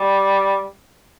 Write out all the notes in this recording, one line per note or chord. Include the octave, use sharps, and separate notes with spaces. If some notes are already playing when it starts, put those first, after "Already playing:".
Already playing: G3